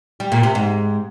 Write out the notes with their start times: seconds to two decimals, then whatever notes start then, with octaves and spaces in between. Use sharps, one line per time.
0.20 G3
0.32 A#2
0.43 C3
0.55 G#2